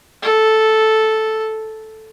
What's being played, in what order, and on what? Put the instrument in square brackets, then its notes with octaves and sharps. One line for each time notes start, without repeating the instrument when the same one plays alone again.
[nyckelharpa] A4